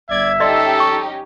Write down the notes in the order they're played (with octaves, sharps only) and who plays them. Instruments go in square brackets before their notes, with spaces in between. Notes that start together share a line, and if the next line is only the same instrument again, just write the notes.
[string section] G1 G#6 [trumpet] D5 [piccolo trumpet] E5
[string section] C#4 D#4 G4 [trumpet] A4 [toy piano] D5 D#5 C6
[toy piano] C#6